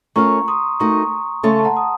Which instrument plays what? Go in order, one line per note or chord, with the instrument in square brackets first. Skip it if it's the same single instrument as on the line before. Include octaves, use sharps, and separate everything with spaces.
[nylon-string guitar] A3 C#4 F4 A#4 F5 [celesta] A#5 C#6
[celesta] C6 D#6
[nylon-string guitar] A3 D#4 F#4 A#4 [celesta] A#5 C#6
[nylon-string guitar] C#3 A3 C#4 A4 C#5 [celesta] A5 C6
[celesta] A5
F#5 A#5
D#6